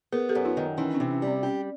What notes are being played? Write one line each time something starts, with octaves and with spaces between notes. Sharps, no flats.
B3 G#4 A#4
G4 A4
F#2
D#4 F4
D#3
E3 C#4 D#4
C#4
C4 D4
C3
C#4
G3 C4
C#4 G4